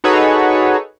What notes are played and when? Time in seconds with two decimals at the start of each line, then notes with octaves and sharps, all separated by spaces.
0.04 D#4 F#4 G#4 A4 B4 C#5